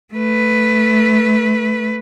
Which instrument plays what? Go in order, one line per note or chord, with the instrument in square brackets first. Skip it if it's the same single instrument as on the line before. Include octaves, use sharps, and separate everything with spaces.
[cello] A3 B4